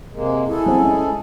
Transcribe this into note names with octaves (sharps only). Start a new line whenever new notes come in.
C3 G#3 A#3
E4 G#4 A4
F#3 C4
G#3 C#4